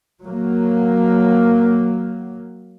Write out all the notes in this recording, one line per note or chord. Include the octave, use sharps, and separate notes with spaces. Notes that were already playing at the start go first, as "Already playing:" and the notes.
F#3 A#3